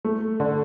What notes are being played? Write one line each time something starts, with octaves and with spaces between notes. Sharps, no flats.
A3
D3